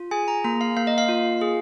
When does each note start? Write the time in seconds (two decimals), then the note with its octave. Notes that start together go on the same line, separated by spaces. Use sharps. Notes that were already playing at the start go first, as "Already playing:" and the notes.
Already playing: F4
0.11 G#4 G#5
0.28 A#5
0.44 A#3 A#5
0.61 F5
0.77 A#3 F5
0.87 D#5
0.98 F5
1.09 F4
1.41 G#4